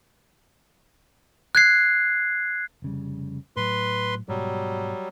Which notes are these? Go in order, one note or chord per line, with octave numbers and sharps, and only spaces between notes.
F#6 G#6 C7
F1 C#3 G3
A2 F#3 B4 C6
G#2 B2 F#3 G3